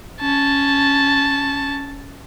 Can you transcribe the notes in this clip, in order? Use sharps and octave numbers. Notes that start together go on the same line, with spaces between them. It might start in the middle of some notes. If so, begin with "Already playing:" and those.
C#4 A5